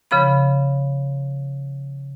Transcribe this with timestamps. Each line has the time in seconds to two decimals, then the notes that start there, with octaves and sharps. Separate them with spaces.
0.11 C#3 F3 B5